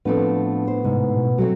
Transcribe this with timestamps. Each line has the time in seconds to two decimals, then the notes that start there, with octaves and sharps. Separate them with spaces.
0.05 A2 F3 A3 B3 C4 D4 B4
0.67 C5
0.84 G#2 C3
1.16 B2
1.38 F#3 A3 C4